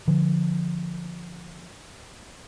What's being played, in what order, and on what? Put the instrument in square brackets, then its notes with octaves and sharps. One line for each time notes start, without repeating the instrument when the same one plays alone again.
[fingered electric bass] D3 F3